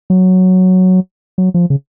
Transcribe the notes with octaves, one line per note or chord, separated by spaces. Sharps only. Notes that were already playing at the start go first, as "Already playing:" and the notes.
F#3
F#3
F3
C#3